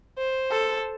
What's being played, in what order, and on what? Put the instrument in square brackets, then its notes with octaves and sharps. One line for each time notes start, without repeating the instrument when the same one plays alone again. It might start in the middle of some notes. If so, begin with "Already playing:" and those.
[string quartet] C5
[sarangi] A4